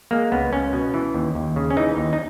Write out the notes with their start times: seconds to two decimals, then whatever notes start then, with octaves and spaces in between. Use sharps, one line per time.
0.11 G#3 A#3
0.32 C#2 B3
0.52 C#2 C#4
0.73 B2
0.94 E3
1.14 D#2
1.35 D#2
1.56 C#3
1.70 C#4
1.77 E3 D#4
1.97 D#2
2.13 D#4